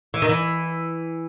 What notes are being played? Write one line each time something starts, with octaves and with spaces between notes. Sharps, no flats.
E3
D#3
E3